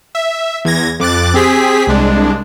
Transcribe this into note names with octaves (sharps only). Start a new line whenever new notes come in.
E5
E2 G#6 A#6
F2 D6 F#6 A6
C4 G4 G#4 B6
C2 G#3 D4